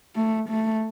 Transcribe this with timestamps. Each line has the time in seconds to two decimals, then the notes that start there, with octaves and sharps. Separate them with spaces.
0.16 A3
0.50 A3